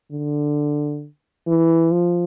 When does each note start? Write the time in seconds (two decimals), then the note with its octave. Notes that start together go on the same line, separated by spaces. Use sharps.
0.12 D3
1.47 E3
1.92 F3